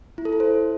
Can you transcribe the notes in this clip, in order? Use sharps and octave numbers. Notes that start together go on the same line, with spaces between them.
E4
A4
E4
C5